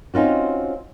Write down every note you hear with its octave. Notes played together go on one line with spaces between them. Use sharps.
C4 C#4 D#4 F4 F#4